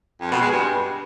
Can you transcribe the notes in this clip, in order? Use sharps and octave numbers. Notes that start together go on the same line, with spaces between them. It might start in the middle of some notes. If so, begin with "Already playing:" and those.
F2
B2
G#3
G2